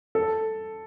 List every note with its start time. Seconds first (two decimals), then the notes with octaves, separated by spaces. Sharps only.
0.15 A4